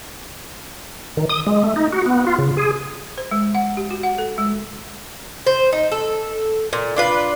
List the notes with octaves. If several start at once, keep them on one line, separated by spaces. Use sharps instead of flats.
D#3
D#6
G#3
A3
D#4
F#4
B3
F4
C#3
G#4
C5
G#3
F#5
G4
F#4
F#5
A4
G#3
C5
D#4
A4
A#2
D4 F4 B4